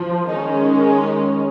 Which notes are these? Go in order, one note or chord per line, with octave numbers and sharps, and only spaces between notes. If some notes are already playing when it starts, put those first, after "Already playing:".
Already playing: F3
D#3 G#3 C#4 D#4